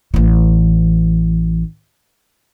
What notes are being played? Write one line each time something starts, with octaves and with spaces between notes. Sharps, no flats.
A1 E3